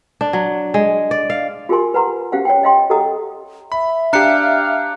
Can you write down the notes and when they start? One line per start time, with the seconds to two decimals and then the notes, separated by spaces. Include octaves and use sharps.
0.21 D4
0.33 F#3
0.74 G#3
1.11 D5
1.30 F5
1.69 F4 G4 G#4 A#4 G#5 C6
1.94 B4 F#5 A#5 C6
2.32 C#4 G4 C5 F5 F#5
2.45 C#5 F#5 G5
2.63 D#5 F5 G5 C6
2.90 G4 A4 D#5 F#5 A#5 D#6
3.72 E5 B5
4.13 D4 G4 F5 A#5 F#6 C#7